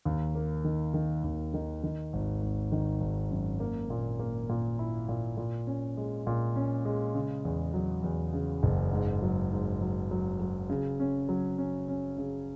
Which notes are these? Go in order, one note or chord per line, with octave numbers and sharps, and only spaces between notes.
D#2
A#3
D#3
D#3
D#2
D#3
D#3
G#1
G#1
D#3
G#1
F#2
A#3
A#2
A#3
A#2
E4
A#2
A#2
C#4
G#3
A#2
C#4
G#3
C#3
E2
F#3
E2
C#3
F#1
G#2
F#3
G#2
F#3
F#3
F#3
C#3
C#4
F#3
C#4
C#4
C#3